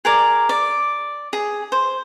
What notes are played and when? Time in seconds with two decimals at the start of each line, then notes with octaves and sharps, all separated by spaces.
0.05 G#4 A#4 D5
0.49 D5
1.33 G#4
1.72 C5